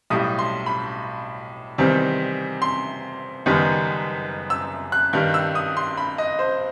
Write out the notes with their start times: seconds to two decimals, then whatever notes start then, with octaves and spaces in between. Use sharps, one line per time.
0.10 B1 A2 G3 D#6
0.39 C6
0.66 B5
1.78 E2 C3 D#3 G3 C4
2.62 C6
3.46 F#1 F#2 D#3 G3 B3
4.50 E6
4.92 F#6
5.13 G2 D#3 G3 G6
5.34 E6
5.55 D#6
5.77 C6
5.97 B5
6.18 D#5
6.39 C5